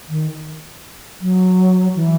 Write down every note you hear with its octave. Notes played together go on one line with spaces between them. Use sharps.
D#3
F#3
E3